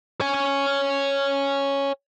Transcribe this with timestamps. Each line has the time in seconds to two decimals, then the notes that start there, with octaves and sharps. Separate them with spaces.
0.21 C#5 G#5